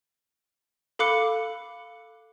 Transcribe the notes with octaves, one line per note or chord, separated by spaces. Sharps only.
A4 F5 B5 D6 F#6 C#7